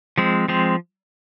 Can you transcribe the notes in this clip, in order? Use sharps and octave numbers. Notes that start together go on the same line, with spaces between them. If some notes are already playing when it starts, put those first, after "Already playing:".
F3 G#3 C4
F3 G#3 C4